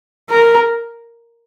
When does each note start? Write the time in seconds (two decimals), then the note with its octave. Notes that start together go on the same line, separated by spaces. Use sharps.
0.30 A#4